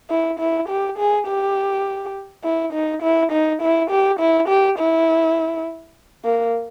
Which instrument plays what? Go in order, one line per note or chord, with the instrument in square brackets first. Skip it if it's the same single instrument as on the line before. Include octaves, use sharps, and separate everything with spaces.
[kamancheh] E4
E4
G4
G#4
G4
E4
D#4
E4
D#4
E4
G4
E4
G4
E4
A#3